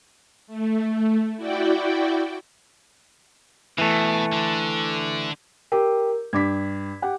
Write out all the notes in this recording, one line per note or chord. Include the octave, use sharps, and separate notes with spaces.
A3
E4 F#4 D5 G5
B2 E3 A3
D3
G4 A#4
G2 D6 G#6 B6
G4 F#5